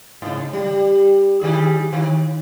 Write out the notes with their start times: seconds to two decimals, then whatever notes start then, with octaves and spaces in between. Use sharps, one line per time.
0.22 G#2 C#3
0.53 G3
1.41 D#3 G3 G#4
1.93 D#3